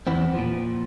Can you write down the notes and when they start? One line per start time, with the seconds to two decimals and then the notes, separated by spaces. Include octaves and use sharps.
0.07 E2 E3 B3 C4
0.34 A#2 F3